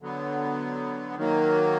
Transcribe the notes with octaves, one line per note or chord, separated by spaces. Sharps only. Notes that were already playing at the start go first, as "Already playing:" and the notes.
D3 F#3 B3
D#3 F#3 A#3